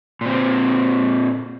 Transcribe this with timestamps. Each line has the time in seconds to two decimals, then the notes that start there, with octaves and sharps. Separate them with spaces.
0.21 A#2 C4